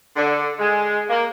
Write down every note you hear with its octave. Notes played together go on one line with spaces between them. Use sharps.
D3
G#3
A#3